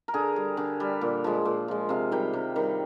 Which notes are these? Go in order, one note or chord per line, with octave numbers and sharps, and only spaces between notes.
A#4
D3 G#4
G3
D3
G3
A#2
F3 G#3
A#2
F3 G#3
C3 F5
D#3 G3 G5
C3
D#3 G3